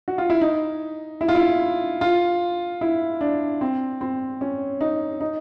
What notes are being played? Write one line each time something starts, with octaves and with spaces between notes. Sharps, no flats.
F#4
F4
E4
D#4
E4
F4
E4
F4
E4
D4
C4
C4
C#4
D#4
D#4